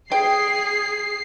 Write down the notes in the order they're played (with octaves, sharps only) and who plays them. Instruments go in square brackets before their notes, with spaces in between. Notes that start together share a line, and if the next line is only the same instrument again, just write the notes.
[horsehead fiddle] G#4 [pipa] G5 [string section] C7